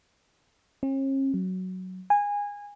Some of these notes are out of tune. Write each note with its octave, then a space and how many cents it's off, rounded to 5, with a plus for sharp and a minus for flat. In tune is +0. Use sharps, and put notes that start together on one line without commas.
C#4 -45
F#3 +5
G#5 -20